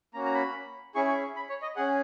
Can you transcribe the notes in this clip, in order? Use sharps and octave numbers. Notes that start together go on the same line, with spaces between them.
A#3 C#4 F#4 A#5
A#5
B5
C#4 E4 G#4 C#6
C#6
B5
C#5
D#5
C#4 G#4 F#5